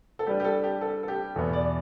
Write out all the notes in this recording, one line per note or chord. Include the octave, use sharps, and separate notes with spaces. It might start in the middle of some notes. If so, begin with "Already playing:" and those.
A4
G3 D4 G4 B4 D5
G4
A4
G4
A4
A4
G4
E2 B2 B3 A4
D5